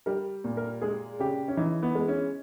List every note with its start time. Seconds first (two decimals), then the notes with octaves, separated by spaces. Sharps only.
0.06 G3 A#4
0.44 A#2
0.57 A#4
0.81 G#3 G#4
1.20 C#3 G4
1.48 C#4
1.57 E3 D#4
1.83 B3
1.95 G#3
2.08 C#4